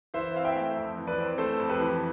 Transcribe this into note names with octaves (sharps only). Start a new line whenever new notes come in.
E3 C5 E5
C4 F5
E5 G5
A3
F2
E3
B4 D5
C4
A3 A4 C5
F2
G4 B4
E3